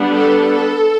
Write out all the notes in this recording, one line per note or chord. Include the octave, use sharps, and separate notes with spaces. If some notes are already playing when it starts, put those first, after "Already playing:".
Already playing: G3 B3 D4
A4